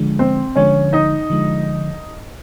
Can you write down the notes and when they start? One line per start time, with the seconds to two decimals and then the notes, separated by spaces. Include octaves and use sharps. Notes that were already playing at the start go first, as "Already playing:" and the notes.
Already playing: D3 F3 G#3
0.19 C4 C5
0.56 D3 F3 G#3 C#4 C#5
0.93 D#4 D#5
1.30 D3 F3 G#3